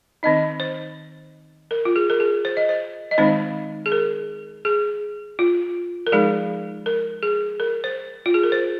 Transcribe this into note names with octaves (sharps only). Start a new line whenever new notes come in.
D#3 C4 D#4 D#5
C5
A#4
F4
G#4
A#4
G#4
C5
D#5
C5
D#5
D#3 G#3 C4 D#4 C5
G#4
A#4
G#4
F4
A#4
F3 G#3 D#4 G#4
A#4
G#4
A#4
C5
F4
G#4
A#4
C5